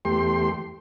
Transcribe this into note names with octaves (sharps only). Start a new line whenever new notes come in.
E2 A3 G4 C6